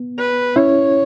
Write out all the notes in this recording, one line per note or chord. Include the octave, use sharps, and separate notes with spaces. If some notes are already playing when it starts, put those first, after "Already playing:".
Already playing: B3
B4
C#4 E4 C#5